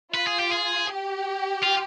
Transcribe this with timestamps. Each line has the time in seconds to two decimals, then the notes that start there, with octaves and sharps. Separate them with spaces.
0.14 F4 B4
0.27 G#4
0.39 G4
0.52 G#4
0.88 G4
1.63 F4